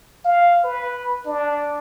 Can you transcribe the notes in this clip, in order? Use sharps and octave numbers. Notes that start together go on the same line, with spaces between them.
F5
B4
D4